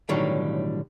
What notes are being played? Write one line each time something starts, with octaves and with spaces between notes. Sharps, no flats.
B1 A2 D3 D#3 F#3 G3